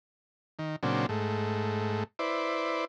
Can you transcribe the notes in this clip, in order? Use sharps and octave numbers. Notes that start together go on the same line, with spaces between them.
D#3
A#2 C#3 F#3 C4 D4
G#2 A3
E4 B4 C5 D5